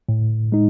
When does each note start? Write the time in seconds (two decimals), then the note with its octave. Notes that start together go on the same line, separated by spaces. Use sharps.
0.09 A2
0.52 G#3 D#4